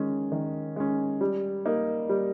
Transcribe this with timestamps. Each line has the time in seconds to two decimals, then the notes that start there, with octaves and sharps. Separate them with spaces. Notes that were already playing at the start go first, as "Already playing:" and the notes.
Already playing: D#3 G#3 C#4
0.32 D#3
0.76 G#3 C#4
1.21 G3
1.65 A#3 D#4
2.09 G3